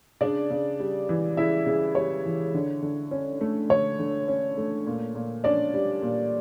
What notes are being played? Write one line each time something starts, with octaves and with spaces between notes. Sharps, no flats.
C#3 D4 D5
C#3
G3
E3
C#3 E4 E5
C#3
G3 C#5
E3
D3
D3
C#4
A3
D3 C#5
D3
C#4
A3
A#2
A#2
C#4 D4 D5
G3
A#2